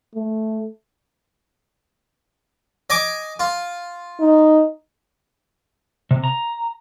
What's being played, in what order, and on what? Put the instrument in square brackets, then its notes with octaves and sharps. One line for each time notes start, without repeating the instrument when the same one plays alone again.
[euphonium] A3
[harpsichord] D#5 G#5 D6
F4
[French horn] D#4
[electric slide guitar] C3
A#5